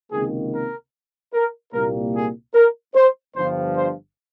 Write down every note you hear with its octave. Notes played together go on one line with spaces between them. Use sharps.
C#2 C3 D#3 A#3 G#4
A#4
A#4
C2 A#2 G3 A#3 A#4
G#4
A#4
C5
G1 G2 F3 C5
C5